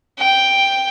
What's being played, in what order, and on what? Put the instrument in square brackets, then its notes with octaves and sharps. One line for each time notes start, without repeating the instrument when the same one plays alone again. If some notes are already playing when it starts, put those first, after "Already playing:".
[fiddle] G5